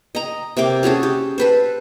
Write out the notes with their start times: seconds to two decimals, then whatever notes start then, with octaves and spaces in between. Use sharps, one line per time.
0.15 D#5 A#5
0.57 C3 A#3 G5 D6
0.83 C#4 F#4 G#4 A4
1.03 G4
1.38 A4 B4 C5